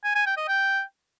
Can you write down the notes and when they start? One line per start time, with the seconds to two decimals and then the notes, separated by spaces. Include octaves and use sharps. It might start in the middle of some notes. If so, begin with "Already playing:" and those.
0.04 G#5
0.15 G#5
0.26 G5
0.37 D#5
0.48 G5